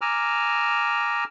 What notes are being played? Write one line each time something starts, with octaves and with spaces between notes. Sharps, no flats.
G#5 A#5 D6 E6 F6